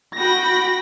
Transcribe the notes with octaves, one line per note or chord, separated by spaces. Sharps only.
F#4 G5 B5 A#6